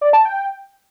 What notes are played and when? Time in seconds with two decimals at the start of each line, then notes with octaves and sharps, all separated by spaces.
0.01 D5
0.13 A5
0.25 G5